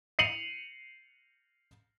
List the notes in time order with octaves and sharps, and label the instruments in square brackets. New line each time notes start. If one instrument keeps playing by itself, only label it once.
[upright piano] C7 C#7 D#7 F7 F#7